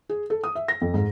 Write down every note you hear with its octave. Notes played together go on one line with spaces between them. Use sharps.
G#4
A4
D#6
E5
A#6
F2
G#2